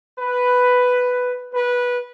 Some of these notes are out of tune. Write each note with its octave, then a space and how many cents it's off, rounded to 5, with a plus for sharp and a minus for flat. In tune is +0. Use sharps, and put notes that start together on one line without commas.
B4 +5
B4 -15